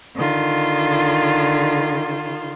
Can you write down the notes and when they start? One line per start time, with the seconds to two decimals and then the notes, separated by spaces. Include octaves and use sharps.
0.16 D3 D#3 F4